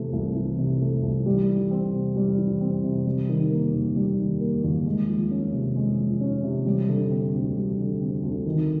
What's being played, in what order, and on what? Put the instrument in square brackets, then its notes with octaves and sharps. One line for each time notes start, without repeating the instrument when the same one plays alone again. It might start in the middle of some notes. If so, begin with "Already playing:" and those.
Already playing: [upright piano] C3 E3 A3
C2
E3
C3
A3
C2
G3
E3
C4
C3
G3
E3
C4
C3
G3
D#3
A#3
D#2
G3
D#3
A#3
D#2
G#3
F3
C#4
C3
G#3
F3
C#4
C3
G3
D3
C4
D2
G3
D3
C4
D2
D#3